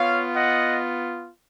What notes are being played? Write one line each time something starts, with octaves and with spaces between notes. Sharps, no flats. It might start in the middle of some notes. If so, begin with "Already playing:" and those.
Already playing: B3 F4 C#5 F5
D#5 F#5